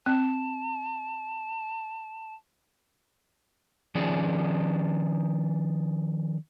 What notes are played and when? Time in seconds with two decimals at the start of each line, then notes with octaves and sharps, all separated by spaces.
0.06 C4 A5
3.95 D#3 F3 C#4 G#4 D5